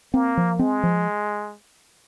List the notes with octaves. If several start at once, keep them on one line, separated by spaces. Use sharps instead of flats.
A#3 C4
F3
G#3 C4
F3